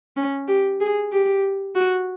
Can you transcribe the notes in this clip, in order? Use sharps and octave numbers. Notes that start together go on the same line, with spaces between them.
C#4
G4
G#4
G4
F#4